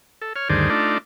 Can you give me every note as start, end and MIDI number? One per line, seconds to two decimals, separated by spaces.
0.22 0.33 69
0.36 0.48 73
0.36 0.48 89
0.49 0.70 38
0.49 0.70 43
0.49 0.70 51
0.49 0.70 68
0.49 0.70 72
0.49 0.70 74
0.70 0.98 57
0.70 0.98 62
0.70 0.98 63
0.70 0.98 65
0.70 0.98 74